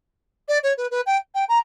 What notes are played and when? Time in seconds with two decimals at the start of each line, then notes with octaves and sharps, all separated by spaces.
0.48 D5
0.63 C#5
0.77 B4
0.91 B4
1.06 G5
1.34 G5
1.48 A#5